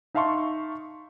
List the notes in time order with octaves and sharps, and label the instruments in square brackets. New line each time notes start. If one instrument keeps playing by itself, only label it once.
[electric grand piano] D#4 E5 F5 A5 C6 C#6